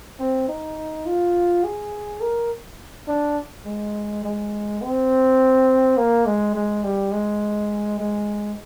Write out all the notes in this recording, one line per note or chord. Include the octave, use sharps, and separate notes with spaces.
C4
D#4
F4
G#4
A#4
D4
G#3
G#3
C4
A#3
G#3
G#3
G3
G#3
G#3